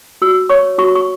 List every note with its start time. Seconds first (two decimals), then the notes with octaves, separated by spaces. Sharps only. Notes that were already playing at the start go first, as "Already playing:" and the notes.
0.22 F#4 E6
0.50 C#5 C#6
0.78 F#4 C#6
0.95 C#6